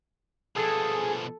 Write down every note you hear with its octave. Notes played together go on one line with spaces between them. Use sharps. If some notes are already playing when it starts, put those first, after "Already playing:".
B2 F3 G#4 A4